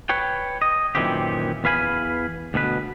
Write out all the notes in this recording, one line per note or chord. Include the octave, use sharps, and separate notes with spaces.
B4 C#5 G5
D#5
F#2 A#2 D#3 E3 C4 G4
E2 B4 F5 G#5 B5
D2 B2 B4